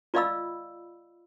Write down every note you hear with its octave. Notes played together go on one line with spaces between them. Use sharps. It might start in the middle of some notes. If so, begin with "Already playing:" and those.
F4 D5 D#5 F5 B5 E6